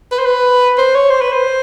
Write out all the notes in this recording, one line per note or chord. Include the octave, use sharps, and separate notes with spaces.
B4
C5
B4
C5
C#5
C5
B4
C5